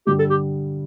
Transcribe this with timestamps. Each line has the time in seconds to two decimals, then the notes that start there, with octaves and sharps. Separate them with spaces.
0.07 G2 D3 G3 G4
0.19 A4
0.30 G4